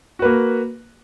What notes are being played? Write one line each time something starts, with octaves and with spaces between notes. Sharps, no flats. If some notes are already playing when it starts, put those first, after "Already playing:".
A#3 F#4 B4